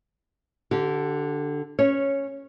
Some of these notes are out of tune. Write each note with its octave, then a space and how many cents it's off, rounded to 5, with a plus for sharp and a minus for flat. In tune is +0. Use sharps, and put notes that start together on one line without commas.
D3 +5 G4 -25
C#4 +0 C#5 -10